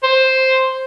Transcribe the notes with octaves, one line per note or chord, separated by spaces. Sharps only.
C5